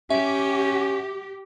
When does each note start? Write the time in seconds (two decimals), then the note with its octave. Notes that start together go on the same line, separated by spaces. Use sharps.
0.10 C#4 G4 E5